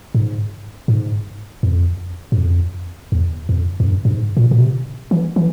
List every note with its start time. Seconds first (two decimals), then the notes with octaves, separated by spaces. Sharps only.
0.15 G#2
0.88 G#2
1.63 F2
2.32 G2
2.38 F2
3.12 E2
3.49 F2
3.80 F2
3.87 G2
4.05 G2
4.12 G#2
4.37 A#2
4.51 A#2
4.61 C3
5.11 E3
5.36 E3